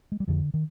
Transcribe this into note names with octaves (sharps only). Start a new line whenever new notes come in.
G#3
G3
F2 D3 F3
D#3